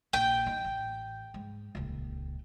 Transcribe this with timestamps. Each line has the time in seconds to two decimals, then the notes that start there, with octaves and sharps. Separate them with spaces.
0.13 A#1 G5
0.46 D#4
0.64 A1
1.34 G#2
1.75 D#1 C#2